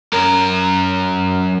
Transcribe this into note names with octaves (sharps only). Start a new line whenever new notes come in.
F#2 A#4